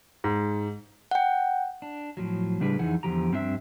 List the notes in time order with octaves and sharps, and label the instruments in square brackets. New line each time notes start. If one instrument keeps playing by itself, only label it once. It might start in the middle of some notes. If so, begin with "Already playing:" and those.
[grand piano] G#2
[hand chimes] F#5 G5
[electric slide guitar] D4
A2 F3 F#3
A2 C#3 G3 D4 G#4 B4
F2 E3 D#4 G#4 F#5
E2 A#2 D3 F3 G4 A#5
G2 C4 D4 F#4 E5